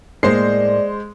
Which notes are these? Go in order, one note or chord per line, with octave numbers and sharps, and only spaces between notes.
A2 G#3 A#3 C5 D5 C7